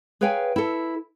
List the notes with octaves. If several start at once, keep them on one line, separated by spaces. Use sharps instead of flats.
G#4 B4 C#5 F5 G5 G#5
E4 A4